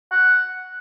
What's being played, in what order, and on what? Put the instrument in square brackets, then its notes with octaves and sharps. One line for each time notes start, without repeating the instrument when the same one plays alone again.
[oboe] F#5